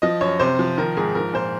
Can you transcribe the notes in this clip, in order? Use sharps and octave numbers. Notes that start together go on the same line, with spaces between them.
F3 D#5
F#2 C#5
C3 C5
F3
D#3 A#4
G#2 G#4
F3 A#4
A#2 C5